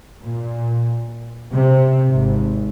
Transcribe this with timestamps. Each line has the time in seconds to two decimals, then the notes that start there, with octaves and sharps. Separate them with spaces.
0.21 A#2
1.50 C3
2.11 G#1